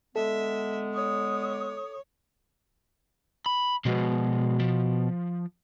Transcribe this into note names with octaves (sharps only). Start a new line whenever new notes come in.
D3 G#3 B3 A4 E5
C#5 D#6
B5
B2 F3 G#3
F3